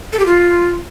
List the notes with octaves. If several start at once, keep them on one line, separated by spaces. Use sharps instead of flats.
A4
G4
F4